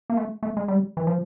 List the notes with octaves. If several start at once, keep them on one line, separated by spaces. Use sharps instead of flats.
A#3
A3
A3
G#3
G3
E3
F3